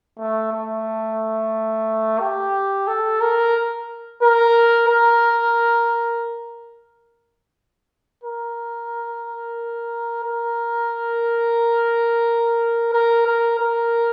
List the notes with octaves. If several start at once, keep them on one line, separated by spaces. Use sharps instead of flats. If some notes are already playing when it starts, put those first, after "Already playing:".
A3
A3
G4
A4
A#4
A#4
A#4
A#4
A#4
A#4
A#4
A#4